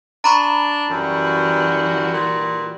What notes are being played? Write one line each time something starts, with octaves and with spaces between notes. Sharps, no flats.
D4 A#5 B5 C#6
F#2 E3 G3 F#4
A#2